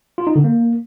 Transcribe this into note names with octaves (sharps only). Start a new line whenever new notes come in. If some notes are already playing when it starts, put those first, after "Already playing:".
F4
D#4
D3
A#3